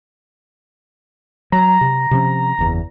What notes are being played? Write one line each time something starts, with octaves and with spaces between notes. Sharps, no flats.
F#3 A#5
C3
C3 F3 C#4
F#1 E2